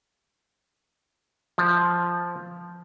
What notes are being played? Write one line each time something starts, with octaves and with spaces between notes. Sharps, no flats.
F3